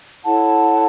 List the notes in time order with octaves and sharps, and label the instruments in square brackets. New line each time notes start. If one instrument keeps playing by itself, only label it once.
[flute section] E4 A4 C#5 F#5 A5